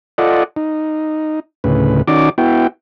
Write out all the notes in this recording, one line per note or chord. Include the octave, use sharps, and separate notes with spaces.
F4 A4 D5 D#5 F#5
D#4
D2 A2 C#3 B4
D#3 C#4 D#4 F#4 D5 D6
B3 E4 F#4 G5